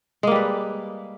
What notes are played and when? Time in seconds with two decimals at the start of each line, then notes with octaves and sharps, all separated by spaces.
0.23 G#3
0.27 A#3
0.31 G3
0.35 B4